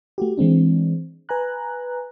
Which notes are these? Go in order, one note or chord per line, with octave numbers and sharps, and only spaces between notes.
A3 F#4 G4
E3 G#3 C4 D4
B4 G#5 A#5 F#6